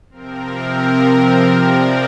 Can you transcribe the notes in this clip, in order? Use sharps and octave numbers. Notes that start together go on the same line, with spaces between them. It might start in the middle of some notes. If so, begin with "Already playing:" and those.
C3 F3 C4 A#4
D5